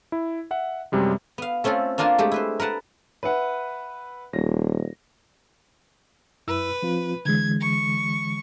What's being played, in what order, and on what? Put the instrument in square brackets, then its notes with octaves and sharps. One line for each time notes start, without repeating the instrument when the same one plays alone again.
[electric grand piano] E4
E5 F#5
F#2 C3 G3 G#3
[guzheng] B3 F5
A3 C4 C#4 F4 A4
A#3 D4 F4 A#4 G#5 A5
G#3 A3 G4
E4 B4 C5
A#4 B4 F#5 A5
[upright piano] B4 E5 F#5
[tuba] D#1 [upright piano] A#6
[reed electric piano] F#2 E4 E6 [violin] B4
[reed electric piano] F3 C4 F4
[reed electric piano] D3 E3 G#3 [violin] G#6
[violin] C#6